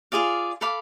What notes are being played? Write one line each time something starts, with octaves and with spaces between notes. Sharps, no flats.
F4 G#4 D5 F5
A4 F5 B5 D6